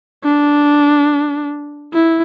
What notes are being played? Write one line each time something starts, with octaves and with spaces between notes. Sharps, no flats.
D4
E4